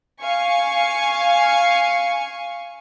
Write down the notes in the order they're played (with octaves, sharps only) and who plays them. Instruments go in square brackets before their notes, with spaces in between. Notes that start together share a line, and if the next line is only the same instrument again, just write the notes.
[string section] F5 G#5 C#6